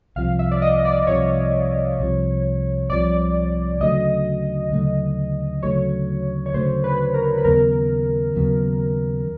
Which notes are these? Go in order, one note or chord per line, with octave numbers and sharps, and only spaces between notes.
C2 C3 F3 F5
E5
D5
D#5
D5
C2 C3 F3 C#5
C2 C3 F3
C2 C3 F3 D5
D2 C#3 F#3 A3 D#5
D2 C#3 F#3 A3
D2 C#3 F#3 A3 C#5
C#5
D2 C#3 F#3 A3 C5
B4
A#4
B4
D#2 C#3 F#3 B3 A#4
D#2 C#3 F#3 B3